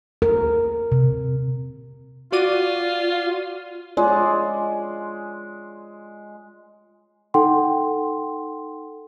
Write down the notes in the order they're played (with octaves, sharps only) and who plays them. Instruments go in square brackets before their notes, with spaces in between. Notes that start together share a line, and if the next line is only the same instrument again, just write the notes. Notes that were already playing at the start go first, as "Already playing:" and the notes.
[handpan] A#4
C3
[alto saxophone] F4 [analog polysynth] F#4 D5 D#7
[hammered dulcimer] G#3 [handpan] F4 C#5 D5
[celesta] D#4 A4 F#5 G5 C6